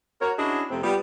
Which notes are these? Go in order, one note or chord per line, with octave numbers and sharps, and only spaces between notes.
F#4 A#4 C#5
C#4 D4 E4 F#4 G#4 D#5
F2 C3 A3 C4
G3 B3 F4